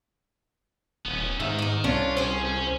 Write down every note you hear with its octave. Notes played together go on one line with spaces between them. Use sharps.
D#1 B3 C#4
G#2 D#3 E5
D5 D#5
C2 C#4 D4 F4
C#4 G#4 C5
C#4